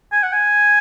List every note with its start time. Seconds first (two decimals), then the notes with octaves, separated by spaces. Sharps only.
0.12 G#5
0.23 F#5
0.33 G#5